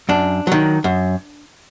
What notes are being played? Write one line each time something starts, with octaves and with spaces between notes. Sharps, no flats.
F#2 D4
D#3 F#3
F#2